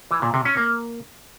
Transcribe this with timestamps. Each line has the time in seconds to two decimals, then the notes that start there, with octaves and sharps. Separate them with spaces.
0.11 E3
0.22 A#2
0.34 C3
0.45 C#4
0.57 A#3